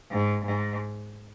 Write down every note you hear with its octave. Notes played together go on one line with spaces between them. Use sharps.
G#2
G#2